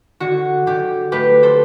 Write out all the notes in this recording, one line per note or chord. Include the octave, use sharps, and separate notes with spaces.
D3 F#4
D3 G4
A3 G4 B4
A4 C5